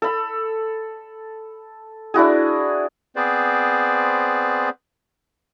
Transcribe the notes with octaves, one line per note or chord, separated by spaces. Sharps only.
A4 B5
D4 E4 F#4 G#4
B3 C4 G#4 B4 C5 D5